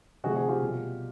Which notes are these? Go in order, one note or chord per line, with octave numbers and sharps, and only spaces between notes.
C3 F3 A3 F#4 G#4
F#4 G#4
F4 G4
B2 G3